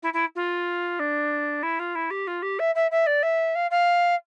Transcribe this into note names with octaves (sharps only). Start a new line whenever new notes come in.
E4
E4
F4
D4
E4
F4
E4
G4
F4
G4
E5
E5
E5
D5
E5
F5
F5